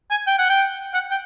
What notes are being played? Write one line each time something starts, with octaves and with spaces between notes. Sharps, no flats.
G#5
G5
F#5
G5
F#5
G5